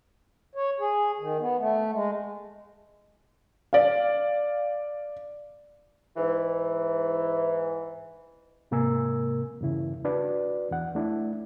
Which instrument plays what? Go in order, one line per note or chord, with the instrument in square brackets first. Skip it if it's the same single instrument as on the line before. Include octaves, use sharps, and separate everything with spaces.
[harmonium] C#5
G#4
D#3
B3
A3
G#3
[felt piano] D5 F5
[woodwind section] G#2 E3
[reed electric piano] G#2 C3 A#3 A#4 G#5 E6
E2 G2 C#3 E4
D4 F#4 B4 D5
E2 F#5
A3 D4 E4